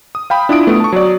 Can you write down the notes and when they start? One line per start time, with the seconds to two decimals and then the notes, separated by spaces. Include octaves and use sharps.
0.15 D#6
0.30 F5 G5 B5
0.49 D4 E4 F4 D#6 D7
0.67 A3 B3
0.80 A5 C#6
0.93 F#3 D5